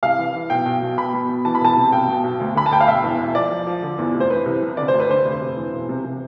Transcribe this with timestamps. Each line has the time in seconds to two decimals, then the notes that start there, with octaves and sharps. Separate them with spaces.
0.03 C2 F5
0.18 E3
0.34 E3
0.50 B1 G5
0.66 B1
0.82 B2
0.97 B2 B5
1.13 B2
1.29 B2
1.45 E3 A5
1.55 B5
1.61 E1 A5
1.77 C3
1.92 B1 G5
2.08 B2
2.24 B1
2.40 D2
2.55 D3 B5
2.66 A5
2.71 D2 G5
2.80 F5
2.88 E1 E5
3.03 E2
3.20 E1
3.35 F3 D5
3.51 F3
3.67 F3
3.82 D3
3.98 E2
4.14 F1
4.20 C5
4.30 E3 B4
4.46 C2
4.62 C3
4.77 D3 D5
4.88 C5
4.93 D2
5.00 B4
5.09 D3 C5
5.25 F1
5.41 F1
5.56 E3
5.73 E1
5.89 C3
6.04 C3